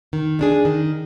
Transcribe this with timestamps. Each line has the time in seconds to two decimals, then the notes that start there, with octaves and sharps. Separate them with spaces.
0.13 D#3
0.39 G#3 D4 G#4
0.65 D#3